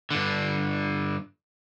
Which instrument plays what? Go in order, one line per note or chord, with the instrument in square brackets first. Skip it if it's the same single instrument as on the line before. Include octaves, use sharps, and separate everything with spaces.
[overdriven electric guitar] G2 D3